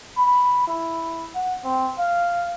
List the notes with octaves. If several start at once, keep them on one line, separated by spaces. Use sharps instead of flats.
B5
E4
F#5
C4
F5